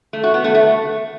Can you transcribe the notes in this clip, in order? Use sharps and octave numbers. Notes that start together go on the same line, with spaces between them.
A3
F#4
B3
A3
A3